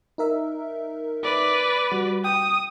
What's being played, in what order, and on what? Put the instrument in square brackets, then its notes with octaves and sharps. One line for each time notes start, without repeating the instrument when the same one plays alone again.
[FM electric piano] D#4 A#4 E5
[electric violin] B4 D5
[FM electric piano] G3 F#4
[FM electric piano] G5 [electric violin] D#6